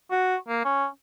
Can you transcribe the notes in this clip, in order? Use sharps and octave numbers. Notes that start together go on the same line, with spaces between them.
F#4
A#3
C#4